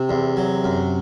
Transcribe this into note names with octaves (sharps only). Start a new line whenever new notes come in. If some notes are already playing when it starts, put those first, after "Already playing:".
Already playing: C3 C4
E2
F#3
F#2